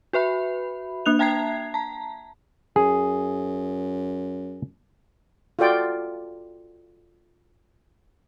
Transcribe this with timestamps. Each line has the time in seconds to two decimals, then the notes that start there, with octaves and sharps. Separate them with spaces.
0.13 F#4 B4 E5 B5
1.06 A#3 D4 F#6 F7
1.19 E5 G5 A5 A#5 G#6 C7
1.74 A5 A#5
2.76 F#2 G#4
5.59 F4 F#4 A4 D5 G5